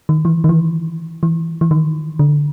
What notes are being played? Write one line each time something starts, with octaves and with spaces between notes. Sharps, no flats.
D#3
E3
D#3
E3
E3
E3
D#3
D3